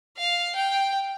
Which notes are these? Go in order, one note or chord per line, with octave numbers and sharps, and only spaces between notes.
F5
G5